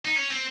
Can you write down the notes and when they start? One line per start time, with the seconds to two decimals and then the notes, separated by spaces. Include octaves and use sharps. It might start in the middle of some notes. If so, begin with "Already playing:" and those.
0.05 D#4
0.16 C#4
0.30 C4